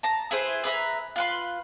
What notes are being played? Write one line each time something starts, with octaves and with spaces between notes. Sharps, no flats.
A5 A#5
E4 G#4 B4 C5
G#4 B4 E5 A#5
F4 B4 C6